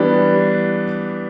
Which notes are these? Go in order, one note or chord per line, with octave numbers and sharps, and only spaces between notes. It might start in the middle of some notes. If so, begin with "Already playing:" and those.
Already playing: E3 G3 B3 D4